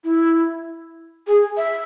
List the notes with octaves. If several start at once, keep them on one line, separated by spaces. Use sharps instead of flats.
E4
G#4
E5